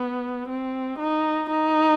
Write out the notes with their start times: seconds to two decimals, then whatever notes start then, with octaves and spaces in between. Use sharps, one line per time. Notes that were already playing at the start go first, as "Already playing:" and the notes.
Already playing: B3
0.48 C4
0.99 D#4
1.50 D#4